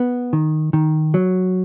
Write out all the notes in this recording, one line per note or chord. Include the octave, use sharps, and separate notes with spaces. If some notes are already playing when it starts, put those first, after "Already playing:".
Already playing: B3
D#3
D#3
F#3